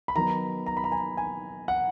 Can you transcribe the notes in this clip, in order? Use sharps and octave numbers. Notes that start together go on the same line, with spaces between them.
B5
D#3 F#3 B3 A#5
A#5
B5
A#5
G#5
G#5
F#5